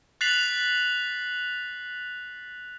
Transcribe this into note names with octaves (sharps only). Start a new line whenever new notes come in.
F#6 A6 B6 C7 F7 F#7